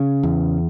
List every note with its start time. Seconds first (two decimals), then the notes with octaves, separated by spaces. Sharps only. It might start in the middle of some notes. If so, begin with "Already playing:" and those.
Already playing: C#3
0.23 E2